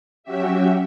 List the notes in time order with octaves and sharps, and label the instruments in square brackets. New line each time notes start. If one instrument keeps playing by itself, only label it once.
[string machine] F#3 C#4 F#4 G4 E5